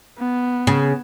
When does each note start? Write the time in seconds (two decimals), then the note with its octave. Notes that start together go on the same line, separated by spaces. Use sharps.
0.18 B3
0.67 C#3